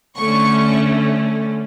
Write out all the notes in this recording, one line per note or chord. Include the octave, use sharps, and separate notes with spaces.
D3 A3 C#4 C#6